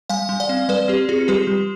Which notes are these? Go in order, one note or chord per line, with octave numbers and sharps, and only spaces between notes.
G3 F5 G#5
G3
D5 F5
C4
G3 B4 D5
C4 G4
C4 F4 G#4
G3 G4 B4
G3